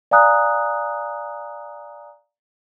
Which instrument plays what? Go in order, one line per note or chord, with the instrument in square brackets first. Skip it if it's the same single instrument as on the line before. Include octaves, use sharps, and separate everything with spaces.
[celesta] D5 F5 G#5 A#5 D#6 F#6